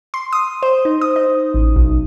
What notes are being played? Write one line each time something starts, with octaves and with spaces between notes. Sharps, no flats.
C6
D#6
C5
D#4
D#6
D#4
A1
B1